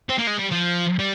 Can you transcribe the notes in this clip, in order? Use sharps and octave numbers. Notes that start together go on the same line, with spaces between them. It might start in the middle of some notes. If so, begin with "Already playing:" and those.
C4
A#3
G#3
G3
F3
G3